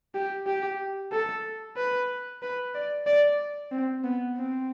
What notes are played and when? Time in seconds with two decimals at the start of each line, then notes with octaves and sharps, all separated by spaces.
0.15 G4
0.47 G4
1.12 A4
1.77 B4
2.42 B4
2.75 D5
3.06 D5
3.71 C4
4.04 B3
4.36 C4